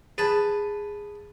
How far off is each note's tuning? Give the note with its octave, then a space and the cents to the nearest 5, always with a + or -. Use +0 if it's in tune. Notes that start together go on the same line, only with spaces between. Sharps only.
G#4 -10 B4 +0 A5 +0